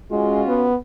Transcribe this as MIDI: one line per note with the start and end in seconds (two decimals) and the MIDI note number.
0.11 0.43 56
0.11 0.68 61
0.11 0.68 65
0.11 0.68 66
0.48 0.76 59